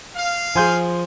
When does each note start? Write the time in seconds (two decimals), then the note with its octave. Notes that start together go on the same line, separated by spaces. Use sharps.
0.16 F5
0.55 F3 G#4 G#5 C6 G6